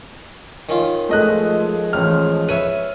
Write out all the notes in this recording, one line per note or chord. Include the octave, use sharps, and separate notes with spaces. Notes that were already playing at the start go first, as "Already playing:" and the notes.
D#3 C#4 F4
F3 G#3 A3 D#5 F#6
A1 F6
B4 C#5 E5 D#7